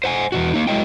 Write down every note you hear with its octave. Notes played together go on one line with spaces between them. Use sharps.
C5 F#5 G#5
E2 A#2 F#4
A#3 D#4
F#3 G#3 E4 D5 D#5 G5